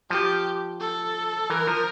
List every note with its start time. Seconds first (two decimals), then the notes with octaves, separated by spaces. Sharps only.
0.10 F3 G4
0.80 A4
1.50 E3 A#4
1.67 F3